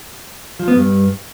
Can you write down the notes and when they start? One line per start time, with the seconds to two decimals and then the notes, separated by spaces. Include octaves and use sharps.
0.59 F3
0.68 B3
0.76 G2